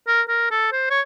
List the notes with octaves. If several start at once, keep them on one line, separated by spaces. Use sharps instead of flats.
A#4
A#4
A4
C5
C#5